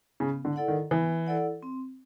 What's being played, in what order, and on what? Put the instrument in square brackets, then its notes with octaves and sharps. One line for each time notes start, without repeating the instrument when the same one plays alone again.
[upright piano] C#3 [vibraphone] B3
[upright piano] D3
[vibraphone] E4 A4 D5 F#5
[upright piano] D#3
[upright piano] E3 [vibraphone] B3
[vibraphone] E4 A4 D5 F#5
C4